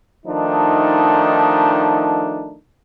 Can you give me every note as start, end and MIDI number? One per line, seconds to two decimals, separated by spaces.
0.26 2.56 51
0.26 2.56 53
0.26 2.56 57
0.26 2.56 62
0.26 2.56 63